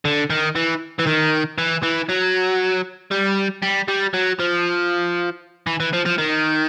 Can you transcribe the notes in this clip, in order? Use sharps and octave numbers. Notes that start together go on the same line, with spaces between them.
D3
D#3
E3
E3
D#3
E3
E3
F#3
G3
G3
G3
F#3
F3
E3
E3
F3
F3
D#3